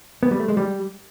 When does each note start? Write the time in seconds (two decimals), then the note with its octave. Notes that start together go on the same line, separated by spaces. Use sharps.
0.23 B3
0.31 G3
0.40 A3
0.48 G#3
0.57 G3